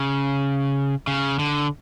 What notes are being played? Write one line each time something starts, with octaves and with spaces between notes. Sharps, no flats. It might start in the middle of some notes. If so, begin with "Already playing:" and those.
Already playing: C#3
C#3
D3